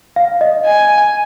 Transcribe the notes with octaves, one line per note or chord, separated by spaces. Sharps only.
F5
D#5
G#5